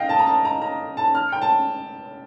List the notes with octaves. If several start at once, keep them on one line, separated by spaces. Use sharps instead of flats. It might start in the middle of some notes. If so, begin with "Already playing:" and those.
Already playing: D#5 F5 G5
A5
A#5
A5
A#5
A#5
A5
F6
G5
A5